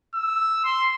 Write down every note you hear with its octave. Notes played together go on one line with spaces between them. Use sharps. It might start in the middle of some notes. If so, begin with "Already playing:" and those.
E6
C6